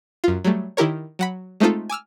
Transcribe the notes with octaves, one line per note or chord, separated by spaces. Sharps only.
F#2 F4
F#3 G3 A3
D#3 E4 G4 A#4 C#5
F#3 F#5 B5
G#3 A3 C4 D#4 F4 A4
G#5 D6 E6 F6